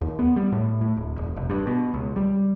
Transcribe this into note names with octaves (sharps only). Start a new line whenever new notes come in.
D#2
B3
G3
A2
A2
D1
E1
F1
G2
B2
C#2
G3